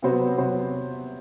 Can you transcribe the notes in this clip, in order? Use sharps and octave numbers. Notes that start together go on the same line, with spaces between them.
C3 F#3 B3 F#4 C5
C3 F#3 B3 F#4 C5